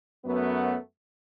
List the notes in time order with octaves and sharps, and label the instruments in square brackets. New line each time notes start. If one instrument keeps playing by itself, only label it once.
[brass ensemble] F#2 F#3 A3 B3